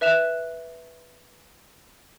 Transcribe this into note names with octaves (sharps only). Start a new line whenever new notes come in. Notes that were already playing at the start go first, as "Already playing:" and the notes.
B4 E5 F#6 E7 F7